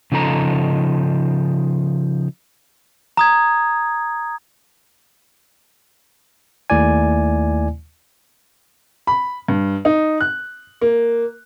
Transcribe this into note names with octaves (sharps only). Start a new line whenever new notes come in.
C#3 F3 D#4 A4 A#5
A#5 D#6 G#6
D#2 A3 E4 D5 G#5
B5
G2
D#4
F#6
A#3